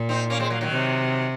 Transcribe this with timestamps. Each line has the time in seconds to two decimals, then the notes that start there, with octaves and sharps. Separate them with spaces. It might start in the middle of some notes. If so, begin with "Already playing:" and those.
Already playing: A#2
0.09 C4 D#4
0.30 A#3 C#4
0.40 G#3 C4
0.50 F#3 A#3
0.61 D#3 F#3
0.71 C3